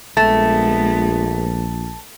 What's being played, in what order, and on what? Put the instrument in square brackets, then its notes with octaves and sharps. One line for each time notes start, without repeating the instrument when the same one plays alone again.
[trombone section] A#1 [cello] G#3 B3 [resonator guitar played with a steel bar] A3 [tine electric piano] A5